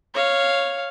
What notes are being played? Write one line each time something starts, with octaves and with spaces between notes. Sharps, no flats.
C#5 F5